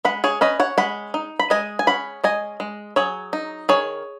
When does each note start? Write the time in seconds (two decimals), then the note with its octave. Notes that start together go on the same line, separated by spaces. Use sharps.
0.05 G#3 F#5 B5
0.24 G#4 C#5
0.41 C#4 B4 D#5
0.60 C#5 F#5
0.78 G#3 F#5 B5
1.14 D#4
1.39 B5
1.50 G#3 D#5 G#5
1.79 G#5
1.87 C#4 F#5 B5
2.24 G#3 D#5 G#5
2.60 G#3
2.96 F#3 G#4 C#5
3.33 D#4
3.69 D#3 G#4 C#5